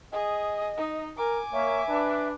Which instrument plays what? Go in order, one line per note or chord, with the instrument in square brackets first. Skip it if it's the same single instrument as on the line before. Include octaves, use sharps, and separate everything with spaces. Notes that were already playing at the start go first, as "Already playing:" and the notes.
[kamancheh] G#4 [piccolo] D#5
[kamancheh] D#4
[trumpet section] A#4 [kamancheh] G#5 D6
[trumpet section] A#3 C#5 [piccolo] E5
[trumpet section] D4 B4